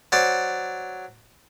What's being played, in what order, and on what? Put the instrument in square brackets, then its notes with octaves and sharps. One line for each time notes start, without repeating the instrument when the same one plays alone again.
[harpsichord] F#3 C5 D5